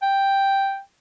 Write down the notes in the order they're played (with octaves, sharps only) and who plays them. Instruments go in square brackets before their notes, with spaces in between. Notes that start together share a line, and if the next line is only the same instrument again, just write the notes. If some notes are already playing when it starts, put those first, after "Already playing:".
[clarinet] G5